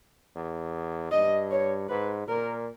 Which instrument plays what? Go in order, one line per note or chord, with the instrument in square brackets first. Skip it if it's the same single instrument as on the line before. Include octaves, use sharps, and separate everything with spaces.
[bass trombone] E2
[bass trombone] G2 [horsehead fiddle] D#5
[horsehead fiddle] C#5
[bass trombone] G#2 [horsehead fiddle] B4
[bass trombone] A#2 [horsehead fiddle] A#4